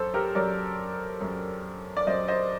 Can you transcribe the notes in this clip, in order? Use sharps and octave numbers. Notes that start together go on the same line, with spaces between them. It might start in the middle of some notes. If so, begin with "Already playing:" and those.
Already playing: F#2 F#3 A4 C5
G4 A#4
F#2 F#3 A#4 D5
F#2 F#3
D5
F#2 F#3 C5 D#5
C5 D#5